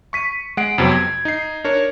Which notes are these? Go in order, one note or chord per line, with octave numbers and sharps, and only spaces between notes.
C#6 B6 D#7
G#3 F#5 C7 D7
F2 C3 F#3 B3 C4
G#6
D#4 C7
D4 A#4 C#5